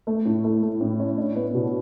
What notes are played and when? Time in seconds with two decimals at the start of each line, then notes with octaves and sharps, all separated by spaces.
0.07 A3
0.25 A2
0.44 A3
0.62 A3
0.81 A2
0.99 C#4
1.18 D4
1.36 B3
1.54 B2